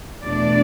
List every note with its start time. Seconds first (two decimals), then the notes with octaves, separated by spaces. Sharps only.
0.24 E2 B2 A3 D4 D5